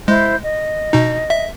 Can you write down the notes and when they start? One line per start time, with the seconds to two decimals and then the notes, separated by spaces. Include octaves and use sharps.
0.08 G#3 E4 C5 G6
0.44 D#5
0.93 B2 D#4
1.30 E5